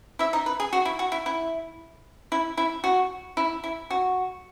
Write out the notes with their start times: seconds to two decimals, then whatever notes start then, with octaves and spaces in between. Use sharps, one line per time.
0.19 E4 E5
0.33 D#4 D#5
0.46 B4
0.60 G#4
0.73 F#4
0.85 E4
0.99 F#4
1.12 E4
1.26 E4
2.32 E4
2.57 E4
2.84 F#4
3.37 E4
3.64 E4
3.90 F#4